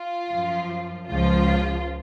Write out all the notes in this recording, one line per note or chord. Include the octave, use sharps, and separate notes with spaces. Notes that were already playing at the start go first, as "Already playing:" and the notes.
Already playing: F4
F#2 F3
C#2 C#3 F3 F4